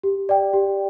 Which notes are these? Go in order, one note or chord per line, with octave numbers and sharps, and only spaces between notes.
G4
D5 G5
G4